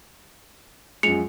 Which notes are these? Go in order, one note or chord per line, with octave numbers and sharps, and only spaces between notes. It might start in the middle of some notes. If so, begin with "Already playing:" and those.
F#2 F3 G#3 C#7 F7